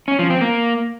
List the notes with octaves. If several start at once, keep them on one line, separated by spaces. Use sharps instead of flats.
C#4
F3
C4
A#3